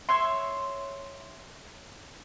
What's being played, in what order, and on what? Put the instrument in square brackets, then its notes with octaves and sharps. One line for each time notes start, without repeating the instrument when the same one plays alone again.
[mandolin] C#5 E5 C6